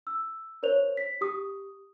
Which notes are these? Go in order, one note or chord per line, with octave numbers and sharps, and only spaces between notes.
E6
A#4 C5 C#5 F7
B6
G4 D#6